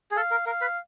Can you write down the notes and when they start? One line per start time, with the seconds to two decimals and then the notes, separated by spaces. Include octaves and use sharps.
0.11 G#4
0.16 A4 F5
0.31 A#4
0.46 A#4 F5
0.61 B4